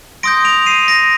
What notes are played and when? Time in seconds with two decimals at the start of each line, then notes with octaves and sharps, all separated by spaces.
0.23 C6 D#6 G6 A#6 D7
0.45 D7 F7
0.66 C7 D#7
0.88 A#6 D7